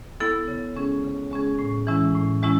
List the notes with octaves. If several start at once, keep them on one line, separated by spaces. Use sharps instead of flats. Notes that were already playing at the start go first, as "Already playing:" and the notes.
B3 E4 A4
C#3
G#3 C#4 G#4
C#3
G#3 C#4 G#4
A2
E3 G#3 C#4 E4
A2
E3 G#3 C#4 E4